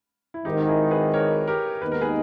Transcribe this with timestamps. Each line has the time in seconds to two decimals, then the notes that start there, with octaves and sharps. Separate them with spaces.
0.34 E4
0.45 G#1 G#2 D#3 D#4 G4
0.68 E4 G#4
0.91 G#4 B4
1.14 A#4 C#5
1.48 G4 A#4
1.82 D#2 D#3 G#3 B3 D#4 B4
1.92 A#4
2.01 G#4 B4